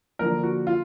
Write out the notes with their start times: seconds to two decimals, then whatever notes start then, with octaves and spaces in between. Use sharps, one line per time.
0.19 D3 F3 A#3 A#4
0.43 F#4
0.67 F4